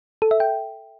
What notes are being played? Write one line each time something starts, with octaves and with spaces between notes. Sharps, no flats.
A4
E5
G5